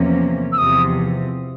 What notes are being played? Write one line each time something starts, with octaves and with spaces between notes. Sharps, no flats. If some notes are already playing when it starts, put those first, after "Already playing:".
Already playing: E2 C3 F3 A#3 C#4
E6
E2 C3 F3 D#6